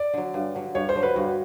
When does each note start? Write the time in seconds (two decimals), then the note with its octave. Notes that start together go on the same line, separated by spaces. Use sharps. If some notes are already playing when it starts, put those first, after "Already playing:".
Already playing: D5
0.14 D3 F#3
0.34 G2
0.55 D3 F#3
0.75 G2 C#5
0.89 C5
0.95 D3 F#3
1.03 B4
1.16 G2 F#4